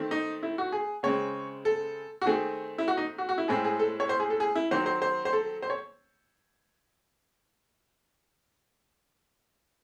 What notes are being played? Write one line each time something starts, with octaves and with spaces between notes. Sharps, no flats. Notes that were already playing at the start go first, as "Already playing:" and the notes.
Already playing: D#3 A3 C4
D#4
E4
F#4
G#4
C#3 G#3 C4 C#5
A4
F#4
D#3 A3 C4 G#4
E4
F#4
D#4
F#4
F#4
E4
A2 G#3 C4 G#4
G#4
A4
C#5
C5
G#4
A4
G#4
E4
D#3 F#3 C4 C5
C5
C5
C5
A4
C5
C#5